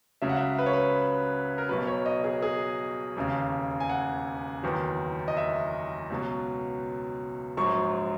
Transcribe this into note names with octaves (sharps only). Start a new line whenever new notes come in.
C#2 C#3 F#3 E5
F#5
E5
B4
C#5
B4
A#4
B1 B2 F#3 B4
C#5
D#5
G#4
G#4
E1 D#2 C#3
G#5
F#5
F#1 E2 D#3 F#3
D#5
E5
C#2 B2 F#3
A#1 G#2 F#3 C#6